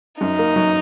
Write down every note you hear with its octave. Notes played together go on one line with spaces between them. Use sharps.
F#2 D#4
A#3
F#3